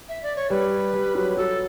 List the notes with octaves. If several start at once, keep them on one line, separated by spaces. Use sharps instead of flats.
E5
D5
C#5
G3 B4
G3
F#3
F#3 A4